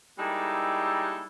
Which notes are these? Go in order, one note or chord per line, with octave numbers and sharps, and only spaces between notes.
G3 G#3 A#3 D#4 E4 A4